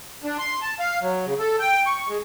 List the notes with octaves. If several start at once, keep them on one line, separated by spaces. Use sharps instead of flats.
D4
C6
A5
F5
F#3
C#3
A4
G5
C#6
G#3